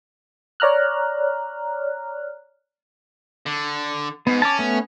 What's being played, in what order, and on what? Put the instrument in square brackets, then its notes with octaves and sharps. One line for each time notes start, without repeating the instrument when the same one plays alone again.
[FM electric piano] C#5 D5 A#5 F6 F#6
[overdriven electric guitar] D3
[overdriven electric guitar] G#2 [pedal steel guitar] B3
[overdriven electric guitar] C#4 [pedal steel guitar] A5 D6
[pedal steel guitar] A3 B3